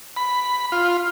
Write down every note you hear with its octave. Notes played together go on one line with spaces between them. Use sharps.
B5
F4